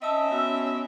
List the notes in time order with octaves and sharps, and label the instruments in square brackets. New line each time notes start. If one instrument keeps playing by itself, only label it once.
[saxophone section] C4 D#4 E5 [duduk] C#4 [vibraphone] D#5 A5 D#6 [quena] E6
[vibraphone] B3 F#4